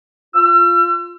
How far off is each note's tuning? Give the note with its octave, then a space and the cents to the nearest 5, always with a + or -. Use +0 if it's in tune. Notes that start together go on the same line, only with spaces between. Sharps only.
F4 +0 E6 +40